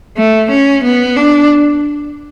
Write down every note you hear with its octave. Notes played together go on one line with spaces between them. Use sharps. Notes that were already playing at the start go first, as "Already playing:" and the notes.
A3
C#4
B3
D4